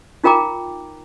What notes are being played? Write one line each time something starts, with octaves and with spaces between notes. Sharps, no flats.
D#4 F4 A#4 G5 A#5 D6